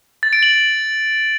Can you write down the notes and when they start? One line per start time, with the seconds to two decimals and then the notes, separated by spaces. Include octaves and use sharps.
0.23 A6
0.33 D7
0.43 F#7